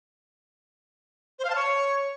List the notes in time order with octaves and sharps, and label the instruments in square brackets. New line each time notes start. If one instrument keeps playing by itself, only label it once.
[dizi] C5
F5
A5
C#5